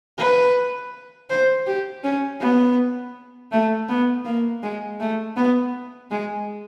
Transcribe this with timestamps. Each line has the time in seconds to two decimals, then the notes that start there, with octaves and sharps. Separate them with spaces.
0.18 B4
1.30 C5
1.67 G4
2.04 C#4
2.41 B3
3.52 A3
3.89 B3
4.25 A#3
4.63 G#3
5.00 A3
5.36 B3
6.11 G#3